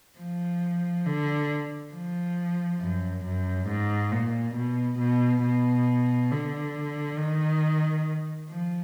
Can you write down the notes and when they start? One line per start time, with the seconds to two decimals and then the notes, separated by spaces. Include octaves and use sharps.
0.18 F3
1.06 D3
1.93 F3
2.80 F#2
3.25 F#2
3.68 G#2
4.12 A#2
4.55 B2
4.99 B2
5.43 B2
6.31 D3
7.18 D#3
8.49 F3